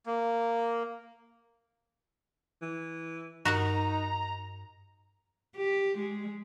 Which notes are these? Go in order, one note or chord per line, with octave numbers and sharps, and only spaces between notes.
A#3
E3
G2 D#4 F#4 A#4 F#5 A#5
G4
G#3